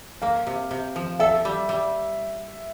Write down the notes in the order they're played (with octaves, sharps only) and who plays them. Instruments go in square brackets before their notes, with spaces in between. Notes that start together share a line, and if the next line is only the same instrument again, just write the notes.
[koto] A#3 [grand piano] F5
[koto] C3
C3
F3
[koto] A4 [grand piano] E5
[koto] G3
G3